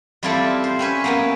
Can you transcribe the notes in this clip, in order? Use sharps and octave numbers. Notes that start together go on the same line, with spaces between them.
G3 C4 E4 F4 A4 D5
C5
C4 C#4 B4 G#5
A#3 B3 C#4